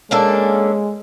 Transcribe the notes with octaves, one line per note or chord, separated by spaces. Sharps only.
G#3 A#3 C#4 D4 A4